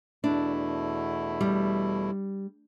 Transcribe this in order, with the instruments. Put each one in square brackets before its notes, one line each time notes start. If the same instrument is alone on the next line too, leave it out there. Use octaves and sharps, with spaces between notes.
[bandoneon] E2 B2 A3 E4 [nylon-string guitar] D4
[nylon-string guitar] G3